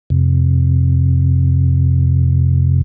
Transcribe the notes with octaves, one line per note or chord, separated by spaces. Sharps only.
F2 C3